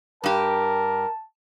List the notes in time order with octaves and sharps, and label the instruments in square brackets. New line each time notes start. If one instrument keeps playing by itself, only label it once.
[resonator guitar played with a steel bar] G2 G4 [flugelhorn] A#4 [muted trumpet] A5